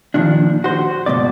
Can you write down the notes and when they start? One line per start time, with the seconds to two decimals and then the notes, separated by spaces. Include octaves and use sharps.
0.14 A#2 D#3 F3 D4
0.64 F#4 C5
1.06 C#2 G2 B2 D5